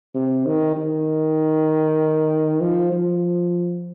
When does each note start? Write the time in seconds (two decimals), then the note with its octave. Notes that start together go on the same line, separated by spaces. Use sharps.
0.15 C3
0.46 D#3
0.77 D#3
2.61 F3
2.92 F3